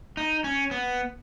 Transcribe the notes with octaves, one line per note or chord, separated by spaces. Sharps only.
D#4
C#4
B3